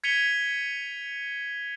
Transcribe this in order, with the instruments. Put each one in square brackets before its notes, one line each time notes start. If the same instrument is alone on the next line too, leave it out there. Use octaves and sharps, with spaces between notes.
[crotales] G#6 B6 C#7 D#7 F7 G7